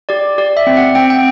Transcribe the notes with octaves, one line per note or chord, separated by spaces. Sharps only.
G4 D5
G4 D5
E5
C4
F#5
C4 G5
G5